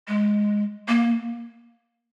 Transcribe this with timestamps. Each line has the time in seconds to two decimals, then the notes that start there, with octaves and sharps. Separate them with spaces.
0.08 G#3
0.88 A#3